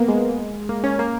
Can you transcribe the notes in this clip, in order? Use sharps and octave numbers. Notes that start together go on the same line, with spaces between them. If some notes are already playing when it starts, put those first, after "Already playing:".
Already playing: A#3 B3
G#3
A#3
C#4
A#3